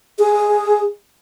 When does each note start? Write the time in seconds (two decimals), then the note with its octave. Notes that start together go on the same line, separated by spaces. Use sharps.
0.19 G#4